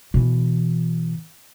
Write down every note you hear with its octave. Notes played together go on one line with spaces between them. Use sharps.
B2 E3